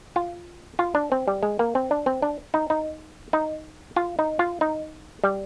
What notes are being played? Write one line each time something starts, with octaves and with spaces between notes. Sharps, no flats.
F4
F4
D4
C4
G3
G#3
A#3
C4
D4
C4
D4
D#4
D#4
D#4
F4
D#4
F4
D#4
G3